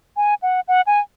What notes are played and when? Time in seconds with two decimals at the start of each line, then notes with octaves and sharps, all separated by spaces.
0.17 G#5
0.42 F#5
0.68 F#5
0.87 G#5